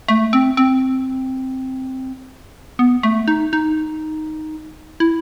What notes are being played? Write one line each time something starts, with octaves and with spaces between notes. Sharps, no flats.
A3
C4
C4
B3
A3
D#4
D#4
E4